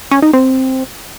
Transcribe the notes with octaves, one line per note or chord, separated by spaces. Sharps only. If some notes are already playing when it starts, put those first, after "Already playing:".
C#4
D#4
C4